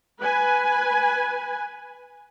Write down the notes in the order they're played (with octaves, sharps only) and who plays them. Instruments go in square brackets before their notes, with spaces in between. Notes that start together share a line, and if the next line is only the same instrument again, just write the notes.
[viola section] B4 G#5